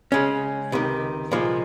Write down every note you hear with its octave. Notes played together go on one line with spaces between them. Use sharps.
C#3 G#3 C#4
C#2 C3 D#3
C2 A#2 F3 G#3